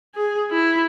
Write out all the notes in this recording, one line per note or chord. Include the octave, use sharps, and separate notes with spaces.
G#4
E4